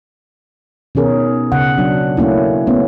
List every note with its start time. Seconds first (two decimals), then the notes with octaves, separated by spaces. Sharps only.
0.95 B2 D#3 C#4 G#4 A#4
1.52 C#3 F#5
1.78 F#3 D4
2.17 A3 A#3 C#4 E4
2.67 A3 B3 C#4